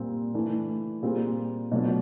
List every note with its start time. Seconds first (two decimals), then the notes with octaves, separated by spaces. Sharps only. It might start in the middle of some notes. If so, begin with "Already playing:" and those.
Already playing: A#2 G3 C4
0.34 E3 A3 D4
1.02 A#2 G3 C4 F4 G#4
1.72 B2 F#3 A3 D4 F4